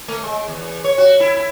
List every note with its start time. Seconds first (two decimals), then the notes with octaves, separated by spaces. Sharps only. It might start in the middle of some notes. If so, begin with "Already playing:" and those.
0.08 A3
0.23 G#3
0.48 E2
0.84 C#5
0.98 F#4
1.20 E4
1.36 E4